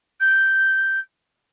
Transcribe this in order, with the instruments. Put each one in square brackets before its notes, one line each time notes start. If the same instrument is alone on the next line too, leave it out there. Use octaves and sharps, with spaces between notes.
[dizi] G6